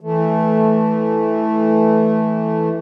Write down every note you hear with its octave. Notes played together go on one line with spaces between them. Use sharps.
E3 A3